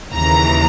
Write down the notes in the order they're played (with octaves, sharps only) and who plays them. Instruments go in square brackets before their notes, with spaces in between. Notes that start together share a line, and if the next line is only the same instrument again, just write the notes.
[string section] D#2 C#3 E3 A#5